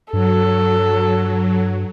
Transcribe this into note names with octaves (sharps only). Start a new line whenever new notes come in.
G2 F#3 A4